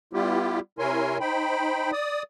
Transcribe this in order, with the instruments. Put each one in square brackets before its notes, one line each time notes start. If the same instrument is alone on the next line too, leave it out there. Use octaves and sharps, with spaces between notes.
[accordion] G3 B3 E4 F4 G4
C3 E4 A#4 C#5 G#5 C6
D#4 C5 G5 B5
D5 D#6